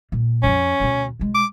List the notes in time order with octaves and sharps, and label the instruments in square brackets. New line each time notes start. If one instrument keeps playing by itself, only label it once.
[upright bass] A#2
[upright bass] F2 F3 [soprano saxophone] C#4
[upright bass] D2 B2
B2 G#3
[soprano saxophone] D6